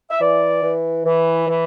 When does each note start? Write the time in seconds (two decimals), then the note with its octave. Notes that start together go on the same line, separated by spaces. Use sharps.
0.10 E5
0.20 E3 D5
0.63 E3
1.05 E3
1.48 E3